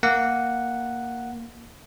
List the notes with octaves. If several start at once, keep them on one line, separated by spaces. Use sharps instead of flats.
A#3 F#5